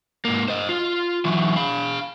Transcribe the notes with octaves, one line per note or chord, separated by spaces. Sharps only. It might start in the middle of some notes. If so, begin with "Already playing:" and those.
G#2 A#3
C5 D#5
F4
E3 F#3
F5 B5